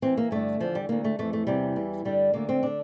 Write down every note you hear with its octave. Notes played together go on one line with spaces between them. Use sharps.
E2 E3 C4
A#3
G2 D3 A3
E2 D3 F3
G3
D2 D3 A#3
A3
F2 E3 A3
A3
E2 C3 E3 G3
E2 E3
G2 D3 G3
D2 D3 A#3
C4
D3 D4